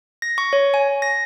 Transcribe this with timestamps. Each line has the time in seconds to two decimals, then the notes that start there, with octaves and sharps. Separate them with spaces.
0.22 A#6
0.38 C#6
0.53 C#5
0.74 G#5
1.02 A#6